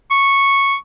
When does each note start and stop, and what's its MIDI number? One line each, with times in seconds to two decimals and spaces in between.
0.11 0.76 85